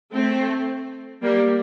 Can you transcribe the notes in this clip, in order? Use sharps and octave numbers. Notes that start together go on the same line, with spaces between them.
A3 C4
G3 A#3